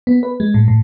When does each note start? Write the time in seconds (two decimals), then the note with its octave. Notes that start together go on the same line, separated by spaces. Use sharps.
0.07 B3
0.23 B4
0.40 G#3
0.54 A2
0.68 A2